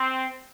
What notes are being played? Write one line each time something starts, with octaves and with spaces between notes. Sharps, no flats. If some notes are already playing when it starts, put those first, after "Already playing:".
Already playing: C4